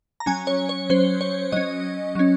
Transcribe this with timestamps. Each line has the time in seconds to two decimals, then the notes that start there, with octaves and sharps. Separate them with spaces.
0.20 A#5
0.26 F#3 C#4 G#5
0.47 C#5
0.69 C#5
0.90 F#3 C#4 C5
1.21 C#5
1.52 F#3 C#4 D#5
2.15 F#3 C#4